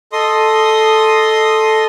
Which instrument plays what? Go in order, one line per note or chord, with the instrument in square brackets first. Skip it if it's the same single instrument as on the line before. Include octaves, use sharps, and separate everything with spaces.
[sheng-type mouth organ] A4 D#5 C6 D#6